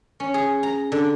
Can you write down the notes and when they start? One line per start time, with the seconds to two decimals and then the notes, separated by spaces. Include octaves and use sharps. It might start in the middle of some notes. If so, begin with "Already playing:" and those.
0.20 C#4
0.34 G#4
0.63 A#5
0.92 D3